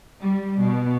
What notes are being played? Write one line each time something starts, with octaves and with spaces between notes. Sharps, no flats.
G3
B2